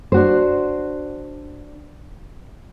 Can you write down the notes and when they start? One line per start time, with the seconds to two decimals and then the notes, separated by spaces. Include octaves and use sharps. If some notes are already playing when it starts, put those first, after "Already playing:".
0.12 D4 F#4 C5